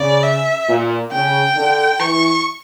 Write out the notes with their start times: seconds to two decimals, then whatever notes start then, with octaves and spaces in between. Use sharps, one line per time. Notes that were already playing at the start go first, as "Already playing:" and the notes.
Already playing: C#3 D5
0.23 E5
0.68 A#2
1.12 C#3 G5
1.56 D3
1.99 E3 C#6